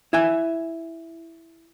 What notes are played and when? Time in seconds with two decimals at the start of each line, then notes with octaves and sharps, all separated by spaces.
0.13 E4 E5 G#5